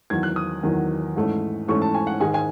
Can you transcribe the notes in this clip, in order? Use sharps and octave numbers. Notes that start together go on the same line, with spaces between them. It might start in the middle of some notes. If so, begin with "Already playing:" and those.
E2 D#3 F#3 G#6
F#6
D#6
E2 D#3 F#3
G#2 E3 A3 C#4
G#2 E3 A3 C#4 C#6
A5
G#5
F#5
G#2 D#3 G#3 G#5
G#5